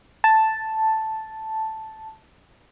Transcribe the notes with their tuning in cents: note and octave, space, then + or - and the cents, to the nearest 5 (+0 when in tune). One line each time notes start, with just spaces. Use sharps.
A5 +0